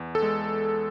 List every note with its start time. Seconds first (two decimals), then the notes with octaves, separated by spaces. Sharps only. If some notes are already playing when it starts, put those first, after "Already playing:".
Already playing: E2
0.15 A4
0.22 G#3